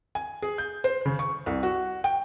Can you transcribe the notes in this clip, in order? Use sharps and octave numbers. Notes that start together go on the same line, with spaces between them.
G#5
G#4
G6
C5
C#3
C#6
C2
F#4
G5